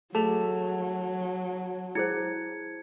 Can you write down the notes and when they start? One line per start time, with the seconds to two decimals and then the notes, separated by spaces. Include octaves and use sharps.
0.15 F#3 A3 G#4 A5 F7
1.95 E4 G#4 C5 G#6 C#7